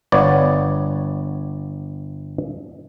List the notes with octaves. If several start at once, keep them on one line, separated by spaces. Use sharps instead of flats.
G1 B3 C#5 D5